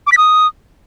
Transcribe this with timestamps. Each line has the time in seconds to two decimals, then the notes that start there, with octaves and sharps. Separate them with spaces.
0.07 D6
0.12 B6
0.17 D#6